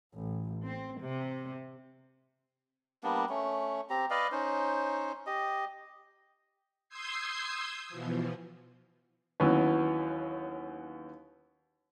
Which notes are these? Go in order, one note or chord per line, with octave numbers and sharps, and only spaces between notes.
A1
C4
C3
G3 A#3 B3 D4
A3 C#4
C4 G4 A#5
B4 D5 D#5 F5
C#4 D#4 C5
G4 D#5
C6 D#6 E6 G6 G#6 C7
B2 E3 F3
D#2 E3 F#3 B3 C#4